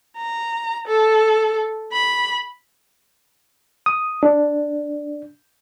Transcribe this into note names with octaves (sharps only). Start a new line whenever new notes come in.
A#5
A4
B5
D#6
D4